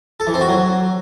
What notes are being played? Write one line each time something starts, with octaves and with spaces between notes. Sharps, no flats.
A4
E3
C4
F#4
F#3